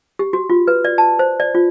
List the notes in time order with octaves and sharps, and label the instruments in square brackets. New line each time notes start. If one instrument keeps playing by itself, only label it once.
[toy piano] G4
F#4
F4
B4
D5
A5
C5
D5
F4